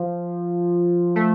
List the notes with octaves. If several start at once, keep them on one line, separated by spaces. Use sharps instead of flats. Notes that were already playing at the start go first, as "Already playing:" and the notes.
Already playing: F3
A3